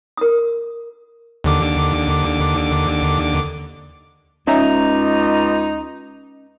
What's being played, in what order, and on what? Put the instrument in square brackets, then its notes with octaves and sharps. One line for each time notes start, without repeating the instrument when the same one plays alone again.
[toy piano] A#4 D#6
[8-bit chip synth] D#2 D3 D6
[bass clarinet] C#2 [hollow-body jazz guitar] C#4 E5 A#5 [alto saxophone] D#4